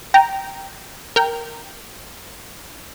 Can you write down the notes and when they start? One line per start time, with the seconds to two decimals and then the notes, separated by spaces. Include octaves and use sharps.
0.14 G5 A#5
1.16 A#4 G5